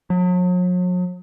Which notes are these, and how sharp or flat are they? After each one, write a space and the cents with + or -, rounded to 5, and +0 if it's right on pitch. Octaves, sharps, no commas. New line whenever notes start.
F#3 -45